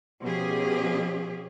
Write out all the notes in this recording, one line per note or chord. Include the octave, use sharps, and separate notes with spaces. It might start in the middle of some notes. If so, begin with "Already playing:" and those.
B2 F3 C#4 G4 G#4